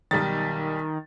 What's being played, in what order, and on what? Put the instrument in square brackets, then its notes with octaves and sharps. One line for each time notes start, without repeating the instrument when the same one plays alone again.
[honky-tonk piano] B1 G3 A6 [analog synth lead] D#3